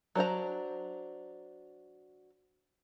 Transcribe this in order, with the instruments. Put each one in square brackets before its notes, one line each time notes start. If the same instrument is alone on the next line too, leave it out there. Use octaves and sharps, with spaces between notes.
[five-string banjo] F#3 D4 C5 A#5